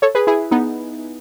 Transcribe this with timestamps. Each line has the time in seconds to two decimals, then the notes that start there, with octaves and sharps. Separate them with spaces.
0.02 A4 C#5
0.15 G#4 B4
0.27 E4 G#4
0.51 B3 D#4